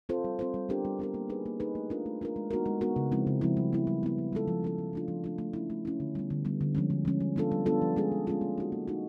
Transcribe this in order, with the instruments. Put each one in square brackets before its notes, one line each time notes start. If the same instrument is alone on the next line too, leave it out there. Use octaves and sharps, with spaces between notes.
[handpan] C4 F4 A4 C5
G3
C4 F4 A4 C5
G3
B3 D4 G4 A#4
G3
B3 D4 G4 A#4
A#3
D#4 G#4 B4
A#3
D#4 G#4 B4
A3
D4 F4 A#4
A3
D4 F4 A#4
G#3
B3 D#4 F#4 A#4
G#3
B3 D#4 F#4 A#4
C#3
F3 G#3 C4 E4
C#3
F3 G#3 C4 E4
G3
B3 E4
G3
B3 E4
F3
G#3 C#4 F4 A4
F3
G#3 C#4 F4 A4
F3
A3 D4 F4
F3
A3 D4 F4
A3
C#4 E4
A3
C#4 E4
D3
G3 B3
D3
G3 B3
D3
F3 G#3 C#4
D3
F3 G#3 C#4
G3
B3 D4 F4 A4
G3
B3 D4 F4 A4
F3
G#3 C#4 F4 G#4
F3
G#3 C#4 F4 G#4
A#3
D#4 F#4
A#3
D#4 F#4